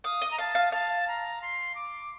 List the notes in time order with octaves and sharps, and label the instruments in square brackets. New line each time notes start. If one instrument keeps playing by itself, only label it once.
[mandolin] F5 [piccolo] D#6
[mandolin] D#5
[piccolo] A#5
[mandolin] F5 [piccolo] A5
[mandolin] F5
[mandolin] F5 [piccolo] A5
[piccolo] A#5
C6
D6